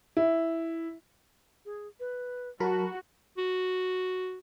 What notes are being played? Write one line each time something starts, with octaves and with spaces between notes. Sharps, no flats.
E4
G#4
B4
F#3 F#4 A#4 A5 B5
F#4